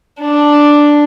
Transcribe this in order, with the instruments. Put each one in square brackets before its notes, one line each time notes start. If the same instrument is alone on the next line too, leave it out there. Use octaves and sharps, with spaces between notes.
[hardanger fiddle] D4